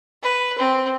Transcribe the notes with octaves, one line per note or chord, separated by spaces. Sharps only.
B4
C4